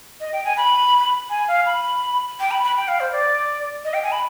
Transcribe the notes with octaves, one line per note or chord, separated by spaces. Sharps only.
D#5
G5
G#5
B5
G#5
F5
B5
G5
B5
B5
G5
F5
C5
D5
D#5
G5
G#5
B5